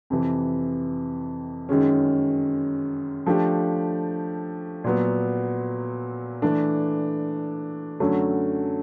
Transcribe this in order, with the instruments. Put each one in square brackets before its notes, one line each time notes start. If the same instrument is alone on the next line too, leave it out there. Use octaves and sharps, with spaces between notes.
[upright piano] F2 C3 E3
F#2 D#3 G#3 C#4
F3 A3 D4 G4
A#2 F#3 B3
E3 A3 D4
F#2 D3 F#3 A3 C#4